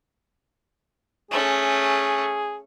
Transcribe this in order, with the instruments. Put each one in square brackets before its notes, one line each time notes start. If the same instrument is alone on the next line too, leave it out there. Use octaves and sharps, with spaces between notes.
[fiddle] A3 C#4 [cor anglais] G#4